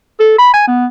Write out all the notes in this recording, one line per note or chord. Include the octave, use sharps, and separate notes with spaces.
A4
B5
G#5
B3